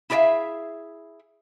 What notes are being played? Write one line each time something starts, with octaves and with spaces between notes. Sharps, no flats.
E4 G#4 A#4 D5 E5 F5